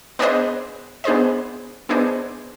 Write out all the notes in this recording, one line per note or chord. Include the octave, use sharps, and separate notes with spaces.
B3 D4 G#4 C5 D#5
B3 D4 G#4 C5 D#5
B3 D4 G#4 C5 D#5